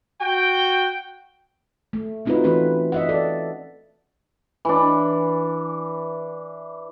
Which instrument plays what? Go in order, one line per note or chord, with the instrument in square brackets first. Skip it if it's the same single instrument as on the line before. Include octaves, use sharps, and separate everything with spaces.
[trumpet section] F#4 G5
[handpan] A3
A3 C4 D#4 F4 F#4 B4
E3 A3 C#4 D#4 B4
D#5 E5 F#5
A4 D5
[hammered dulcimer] E3 D4